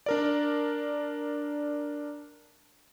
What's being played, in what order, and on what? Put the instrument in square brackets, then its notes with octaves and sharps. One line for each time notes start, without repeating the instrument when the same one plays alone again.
[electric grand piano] D4 A#4 D5